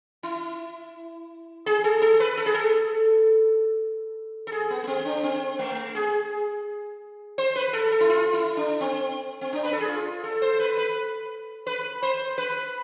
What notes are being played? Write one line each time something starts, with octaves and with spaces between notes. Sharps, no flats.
E4
G#4
A4
A4
B4
A4
G#4
A4
A4
G#4
B3
B3
C4
D4
C4
A3
G#4
C5
B4
A4
A4
E4
F4
E4
D4
C4
C4
D4
B4
A4
G#4
F4
A4
C5
B4
B4
B4
C5
B4